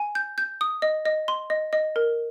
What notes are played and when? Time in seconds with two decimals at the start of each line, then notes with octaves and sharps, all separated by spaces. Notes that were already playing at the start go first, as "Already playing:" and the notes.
Already playing: G#5
0.15 G6
0.38 G6
0.61 D#6
0.82 D#5
1.06 D#5
1.28 C6
1.50 D#5
1.73 D#5
1.96 A#4